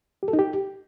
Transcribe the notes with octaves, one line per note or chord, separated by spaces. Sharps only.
G4
A4
D#4
G4